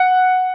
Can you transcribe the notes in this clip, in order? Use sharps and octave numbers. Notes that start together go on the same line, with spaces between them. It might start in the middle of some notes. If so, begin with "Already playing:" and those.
Already playing: F#5